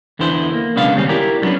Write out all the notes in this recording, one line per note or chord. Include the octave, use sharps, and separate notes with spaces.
E2 D3 B3 E4 C5
A#3
B1 C#3 G#3 B3 D4 F5
D#2 G3 C4 C#4
E4 G4 A#4 D5
D3 F#3 B3 C#4 D4